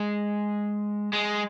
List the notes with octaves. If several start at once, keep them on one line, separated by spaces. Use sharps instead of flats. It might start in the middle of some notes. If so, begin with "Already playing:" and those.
Already playing: G#3
G#3